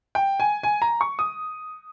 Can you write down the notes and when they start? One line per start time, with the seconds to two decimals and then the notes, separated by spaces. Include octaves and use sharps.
0.15 G5
0.40 G#5
0.63 G#5
0.82 A#5
1.01 C#6
1.19 D#6